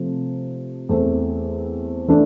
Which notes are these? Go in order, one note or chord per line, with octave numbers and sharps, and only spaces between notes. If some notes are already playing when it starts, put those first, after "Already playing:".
Already playing: C3 F3 A3
E2 E3 A3 C4
E3 A3 D4